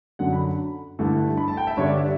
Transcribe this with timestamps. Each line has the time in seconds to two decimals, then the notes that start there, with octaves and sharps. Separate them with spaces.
0.19 F#2 D3 F#3 F#5
0.33 B5
0.99 G2 D3 A3 E4
1.37 B5
1.48 A5
1.57 G5
1.67 E5
1.77 G2 D3 G3 D4 C#5
1.87 D5
1.97 E5